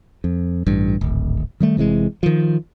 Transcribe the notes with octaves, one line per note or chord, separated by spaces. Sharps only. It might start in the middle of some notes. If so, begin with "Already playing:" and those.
F2
A1 G2
D1 G#1
D#3 G3 A3
F1 C3 E3 G#3
D#3 F3